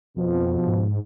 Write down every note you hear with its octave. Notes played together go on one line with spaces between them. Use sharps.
F2 B2 F3
G#2